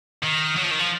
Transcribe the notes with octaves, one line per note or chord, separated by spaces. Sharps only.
D#3
F#3
F3
D#3
F3